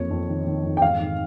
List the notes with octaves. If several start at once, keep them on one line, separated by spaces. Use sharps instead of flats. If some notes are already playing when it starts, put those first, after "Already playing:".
Already playing: F2 A#3 C#5
F2
D#3
D#3
F2
G5
G#2 F5
D#3